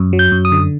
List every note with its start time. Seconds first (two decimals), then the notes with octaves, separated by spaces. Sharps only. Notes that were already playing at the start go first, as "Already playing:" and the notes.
Already playing: F#2
0.13 F#3
0.19 G6
0.32 F#2
0.45 D#6
0.52 D3